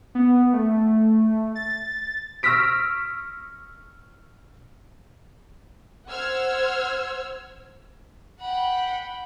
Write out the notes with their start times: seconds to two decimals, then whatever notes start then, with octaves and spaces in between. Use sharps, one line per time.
0.15 B3
0.53 A3
1.55 A6
2.43 C#6 E6 F6 A#6 B6 D7
6.08 C5 F#5 E6 F6 G#6
8.41 F#5 G5 B5